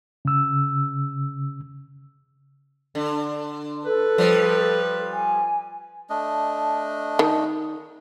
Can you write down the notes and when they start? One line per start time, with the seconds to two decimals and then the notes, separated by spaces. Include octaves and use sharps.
0.25 C#3 E6
2.95 D3
3.85 A4 B4
4.18 F3 G3
5.12 G#5
6.10 A3 D4 D#5
7.19 D#3